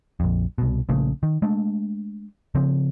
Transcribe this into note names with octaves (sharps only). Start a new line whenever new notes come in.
A#1 F2
C2 B2
A#1 A#2 C#3 A3
D#3
G#3 A3 D4
C#3 F3 C4